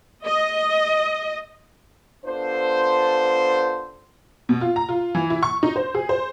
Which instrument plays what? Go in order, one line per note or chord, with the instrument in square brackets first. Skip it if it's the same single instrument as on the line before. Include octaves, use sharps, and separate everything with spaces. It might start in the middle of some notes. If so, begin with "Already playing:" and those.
[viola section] D#5
[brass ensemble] B3 D4 F4 A4 C5
[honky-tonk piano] B2
F4
A#5
F4
E3
E4
C#6
D#4
C5
G#4
C5